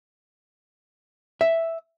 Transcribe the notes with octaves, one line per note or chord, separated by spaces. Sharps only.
E5